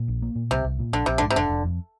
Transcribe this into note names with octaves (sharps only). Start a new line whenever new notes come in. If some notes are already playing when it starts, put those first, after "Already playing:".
Already playing: A#2
A#1
A#3
A#2
C2 C3
C2
A#2
A#1 D3
A#1 C3
D3
G#2
C3
F1 D3
F1
F2